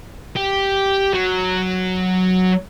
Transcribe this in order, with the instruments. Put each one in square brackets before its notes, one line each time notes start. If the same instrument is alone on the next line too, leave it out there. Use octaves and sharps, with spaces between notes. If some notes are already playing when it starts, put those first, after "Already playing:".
[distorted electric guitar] G4
F#3